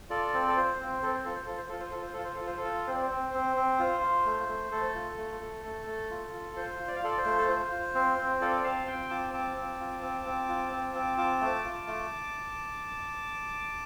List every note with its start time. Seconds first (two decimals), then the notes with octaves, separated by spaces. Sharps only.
0.10 F4 A4 D5
0.33 C4
0.48 A4
0.57 F4 C5
0.80 C4
1.02 C4 A4
1.14 C5
1.25 F4 A4
1.35 C5
1.47 F4 A4
1.58 C5
1.69 F4 A4
1.80 C5
1.91 F4 A4
2.02 C5
2.13 F4 A4
2.24 C5
2.35 A4
2.41 F4
2.46 C5
2.57 A4
2.64 F4
2.87 C4 C5
2.95 D5
3.02 C5
3.11 C4
3.34 C4
3.56 C4
3.80 F4
4.03 F4
4.26 A3
4.48 A3
4.72 A3 A4
4.95 F4
5.18 A3
5.41 A3
5.64 A3
5.87 A3
6.10 F4
6.33 F4
6.56 F4 C5
6.79 F4
6.88 D5
6.96 F5
7.02 F4 A4 D5
7.18 C5
7.26 A3
7.38 A4
7.49 F4 C5
7.72 F4
7.95 C4
8.18 C4
8.41 F4 A4 D5
8.64 C4 F5 A5
8.87 C4 G5 C6
9.10 F4 A5 D6
9.34 C4 A5 D6
9.56 C4
9.80 F4
10.02 C4
10.25 C4
10.49 F4
10.72 C4
10.95 C4
11.18 F4 A5 D6
11.41 A3
11.64 F4
11.87 A3